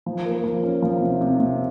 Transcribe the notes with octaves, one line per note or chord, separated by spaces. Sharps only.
F3
A#3
F3
C#4
F3
C3
C3
C3